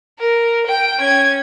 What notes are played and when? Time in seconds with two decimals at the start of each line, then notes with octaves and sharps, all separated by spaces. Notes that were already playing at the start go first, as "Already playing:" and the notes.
0.20 A#4
0.67 G5
1.00 C#4 G#6